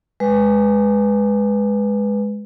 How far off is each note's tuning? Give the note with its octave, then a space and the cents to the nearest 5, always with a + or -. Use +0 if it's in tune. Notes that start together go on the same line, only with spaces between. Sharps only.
G#3 +0 B4 +0